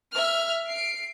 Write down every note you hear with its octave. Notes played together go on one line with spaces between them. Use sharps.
E5 F6
C7 D7